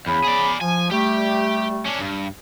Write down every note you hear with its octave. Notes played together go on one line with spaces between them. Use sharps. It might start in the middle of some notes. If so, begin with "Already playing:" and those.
E2 C#3 B3 B5
G#4 D5
F3 G#5
G3 A3 G4
C#4 D4
G2